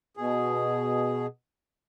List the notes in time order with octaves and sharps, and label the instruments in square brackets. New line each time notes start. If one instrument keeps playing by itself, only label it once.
[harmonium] B2 G#4